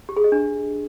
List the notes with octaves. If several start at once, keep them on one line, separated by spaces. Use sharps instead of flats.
G4
G#4
D#5
D4